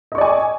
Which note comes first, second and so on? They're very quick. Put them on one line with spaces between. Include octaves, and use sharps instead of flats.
D#5 C#6 D5 G#5